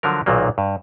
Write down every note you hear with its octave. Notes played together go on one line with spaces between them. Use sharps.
D3 F3 F#3 A#4
B1 A#2 D#3 F#3 A#3
G2